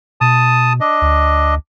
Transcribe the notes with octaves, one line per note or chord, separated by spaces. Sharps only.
B2 A5 D#6
D4 D#5
D2